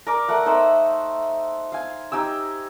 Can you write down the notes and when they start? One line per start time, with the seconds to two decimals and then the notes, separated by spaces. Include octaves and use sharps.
0.07 A#4 D5 D6
0.28 A3 A#4 F#5
0.46 D#4 A4 C5 E5
1.72 F5 G#5
2.12 D#4 G4 G#5 E6